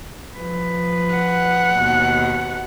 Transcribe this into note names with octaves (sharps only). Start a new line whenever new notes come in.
F3 B4
F#5
D#2 B2